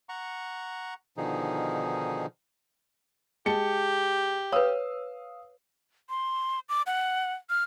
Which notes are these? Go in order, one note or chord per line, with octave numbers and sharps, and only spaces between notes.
F#5 A#5 C#6
B2 D3 D#3 F3 D#4 G#4
G#3 G4 A5 C#7
B4 C#5 F5 D#6 E6
C6
D6
F#5
F6